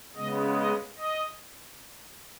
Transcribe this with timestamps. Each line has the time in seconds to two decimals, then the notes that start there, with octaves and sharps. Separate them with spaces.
0.16 C#3 G#3 B3 D#5
0.56 D#5
0.96 D#5